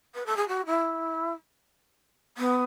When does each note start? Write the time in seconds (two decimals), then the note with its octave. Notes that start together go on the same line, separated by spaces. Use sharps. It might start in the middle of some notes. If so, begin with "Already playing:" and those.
0.14 B4
0.26 A4
0.36 G#4
0.48 F#4
0.66 E4
2.37 B3